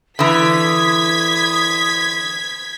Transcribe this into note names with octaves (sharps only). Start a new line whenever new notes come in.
D3 E3 D#6 G#6 B6